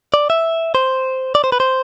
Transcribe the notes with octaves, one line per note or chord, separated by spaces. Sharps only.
D5
E5
C5
D5
C5
B4
C5